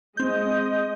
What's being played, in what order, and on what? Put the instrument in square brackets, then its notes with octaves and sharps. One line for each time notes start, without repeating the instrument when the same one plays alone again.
[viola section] G#3 D#5 [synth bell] C4 G6